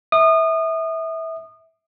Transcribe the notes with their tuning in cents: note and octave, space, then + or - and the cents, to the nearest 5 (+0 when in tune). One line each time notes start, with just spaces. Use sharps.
E5 -20 D#6 -30